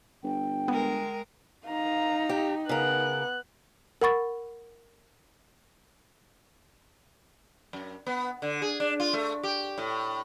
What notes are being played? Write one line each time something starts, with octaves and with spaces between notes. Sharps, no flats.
G1 G5
G#3 B3 A#4
D#4 F5 A#5
G4
C#3 B3 A#4 F#6
A#4 F#5 B5 C#6 A6
F#2
B3
D3
G#4
D4
F4
A3
G4
A2